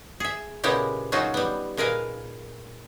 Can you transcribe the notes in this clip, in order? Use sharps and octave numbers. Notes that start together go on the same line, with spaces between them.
G#4 E5
A#2 C#3 G#3 B3 E4 G4
F#3 C#4 D#4 F4 F#4 G#4
G3 B3
A#2 G#3 A#4 B4 F5